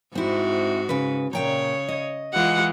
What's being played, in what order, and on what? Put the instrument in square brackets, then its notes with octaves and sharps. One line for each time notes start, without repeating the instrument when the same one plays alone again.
[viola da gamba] G#2 F#4 [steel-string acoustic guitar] C4 E4
[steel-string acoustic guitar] C#3 B4
[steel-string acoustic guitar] A#2 G5 A#5 [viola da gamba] C#3 C#5
[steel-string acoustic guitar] D#5
[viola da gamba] E3 G#3 F4 [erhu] F#5